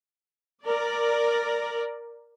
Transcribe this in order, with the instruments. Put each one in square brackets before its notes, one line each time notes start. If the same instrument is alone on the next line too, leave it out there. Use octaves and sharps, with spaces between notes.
[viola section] A#4 D5